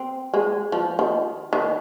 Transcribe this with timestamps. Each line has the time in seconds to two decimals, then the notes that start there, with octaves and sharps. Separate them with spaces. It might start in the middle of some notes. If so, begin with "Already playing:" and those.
Already playing: C4
0.34 G#3
0.72 F3
0.99 D#3
1.53 D#3